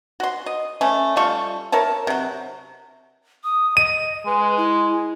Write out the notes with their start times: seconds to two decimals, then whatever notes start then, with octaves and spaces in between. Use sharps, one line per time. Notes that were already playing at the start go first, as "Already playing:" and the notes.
0.20 F#4 C6
0.46 D#5
0.81 A3 C#4
1.17 G3 F4 A4 C#6
1.72 A#4 C#5 E5 A5
2.07 C3 F#3
3.44 D#6
3.77 D#5 D#7
4.26 G#3 B4
4.57 E4